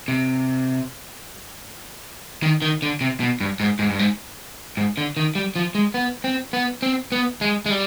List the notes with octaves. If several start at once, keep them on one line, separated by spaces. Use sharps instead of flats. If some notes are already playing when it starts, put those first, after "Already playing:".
C3
D#3
D#3
D3
C3
B2
G2
G#2
G#2
G2
G#2
G#2
D3
D#3
G3
F3
G#3
B3
C4
B3
C4
B3
G#3
G#3
G3